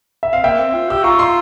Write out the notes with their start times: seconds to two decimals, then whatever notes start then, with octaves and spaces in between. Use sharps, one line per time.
0.23 E5
0.33 C4 F5
0.44 A#3 E5 G5
0.59 C4
0.74 F4
0.89 G4 E6
1.04 F4 A#5 C#6
1.19 C6 E6